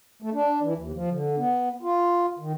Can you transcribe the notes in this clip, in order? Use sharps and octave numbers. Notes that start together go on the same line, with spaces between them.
A3
D4
E3
D#2
F3
D3
B3
F4
D#3